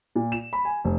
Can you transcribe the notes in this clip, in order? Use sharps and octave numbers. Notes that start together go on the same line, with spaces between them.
A#2
E7
B5
G#5
F1